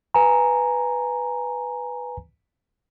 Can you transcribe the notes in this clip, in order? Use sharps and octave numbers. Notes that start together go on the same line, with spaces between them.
B4 G#5 A#5